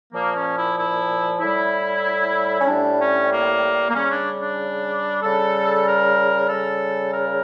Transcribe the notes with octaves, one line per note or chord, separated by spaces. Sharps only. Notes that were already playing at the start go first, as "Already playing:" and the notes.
A#2 F3 A#3
C#4
E4
E4
A2 G3 E4
C#4
A2 G3 D4
C#4
A#3
A#3
C#3 G3 C#4
D4
D4
C#3 G3 A4
A#4
C#3 G3 A4
A#4